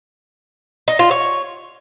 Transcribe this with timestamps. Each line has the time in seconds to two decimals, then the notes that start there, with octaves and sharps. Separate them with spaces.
0.88 D#4
0.99 F4
1.11 C#5